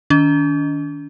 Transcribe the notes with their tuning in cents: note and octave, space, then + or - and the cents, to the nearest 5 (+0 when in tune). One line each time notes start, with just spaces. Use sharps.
D#3 +0 D4 -45